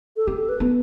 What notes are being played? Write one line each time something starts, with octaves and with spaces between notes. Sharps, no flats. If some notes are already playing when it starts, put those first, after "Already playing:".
A4
C4 G4
A4
B4
B3